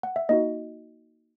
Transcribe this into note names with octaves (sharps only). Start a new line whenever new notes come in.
F#5
E5
A#3 D#4 F#4 D#5